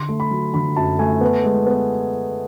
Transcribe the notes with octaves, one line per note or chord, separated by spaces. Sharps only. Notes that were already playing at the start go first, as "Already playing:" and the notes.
Already playing: D3 C6
A3
B5
F#3
D3 B5
F#2 A5
A3 G#5
B3
G#3
B3